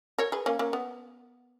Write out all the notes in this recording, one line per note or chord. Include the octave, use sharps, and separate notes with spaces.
A#4 C#5
G#4 B4
A#3 C#4
A#3 C#4
B3